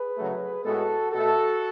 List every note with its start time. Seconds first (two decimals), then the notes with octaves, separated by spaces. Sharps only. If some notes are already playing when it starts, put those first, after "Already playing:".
Already playing: G#4 B4
0.17 C#3 F#3 A3
0.65 A2 G#3 B3 F#4 A4
1.13 B2 A3 F#4 A4